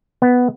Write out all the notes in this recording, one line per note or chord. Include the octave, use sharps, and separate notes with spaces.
B3